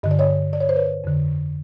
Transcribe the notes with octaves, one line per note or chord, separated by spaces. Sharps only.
G2 D3 D#5
D5
C#5 D#5
D5
C#5
C5
B4 C#5
F2 D3